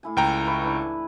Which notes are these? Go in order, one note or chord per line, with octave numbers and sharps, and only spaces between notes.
A2 E4 G#5
C#2 G5 A#5
E4 B4 C#5
E3 D4